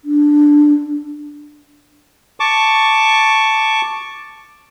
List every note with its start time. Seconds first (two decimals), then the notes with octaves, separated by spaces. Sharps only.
0.05 D4
2.40 A5 C#6 D6